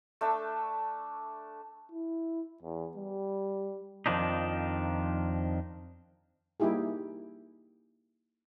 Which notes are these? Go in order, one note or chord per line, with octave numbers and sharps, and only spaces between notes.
A3 D4 E5
E4
E2
G3
F2 D#3 F3 D4 D#4
G3 A#3 D#4 E4 G4 G#4